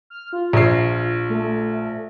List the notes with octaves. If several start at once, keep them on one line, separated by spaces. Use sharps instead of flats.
F6
F4
A#1 C7
A3